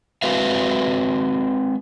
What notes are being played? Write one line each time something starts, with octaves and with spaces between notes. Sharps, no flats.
G#3 C4 F#4 B4 E5 F5